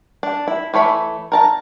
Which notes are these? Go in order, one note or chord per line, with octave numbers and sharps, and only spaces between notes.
D4
E4
E3 A3 C#5 B5
A#4 A5 A#5